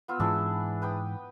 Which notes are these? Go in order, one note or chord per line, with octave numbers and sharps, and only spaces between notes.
B3 F4 E6
G#2 E3 D4 E4 G#4
B4 G5 D#6